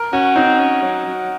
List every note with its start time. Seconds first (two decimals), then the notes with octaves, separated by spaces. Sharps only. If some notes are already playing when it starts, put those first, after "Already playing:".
Already playing: A#4
0.13 C#4 F#4
0.36 C4 D#4
0.59 C#4
0.83 F#3
1.05 F#3